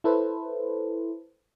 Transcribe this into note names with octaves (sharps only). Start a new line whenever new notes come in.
E4 A4 B4 C5